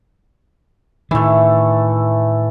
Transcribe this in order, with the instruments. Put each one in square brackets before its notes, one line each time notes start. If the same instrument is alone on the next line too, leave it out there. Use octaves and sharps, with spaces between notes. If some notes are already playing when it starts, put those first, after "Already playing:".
[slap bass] A2 D#3 [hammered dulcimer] E3 A3